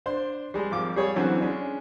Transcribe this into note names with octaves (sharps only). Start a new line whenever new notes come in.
D4 C5 D5 C6
G3 G#3
G#1 F3 D6
G3 G#4 C#5
D3 E3 F#3 C4 C#4
G#3 C#4 D4